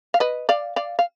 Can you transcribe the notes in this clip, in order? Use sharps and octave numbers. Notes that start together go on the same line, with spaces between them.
F5
B4 D#5
D5 F5
D5 F5
F5